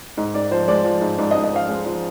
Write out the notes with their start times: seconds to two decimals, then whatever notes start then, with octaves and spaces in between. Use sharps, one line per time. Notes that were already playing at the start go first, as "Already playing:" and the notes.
0.17 G#2
0.34 G#2 D5
0.51 F3 C5
0.68 G#3 D5
0.85 F3
1.01 G#2
1.18 G#2 D5
1.31 D#5
1.35 G#2
1.43 D#5
1.52 F3 F5
1.69 G#3
1.86 F3